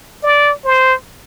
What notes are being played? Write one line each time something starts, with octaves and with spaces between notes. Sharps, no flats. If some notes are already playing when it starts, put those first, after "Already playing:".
D5
C5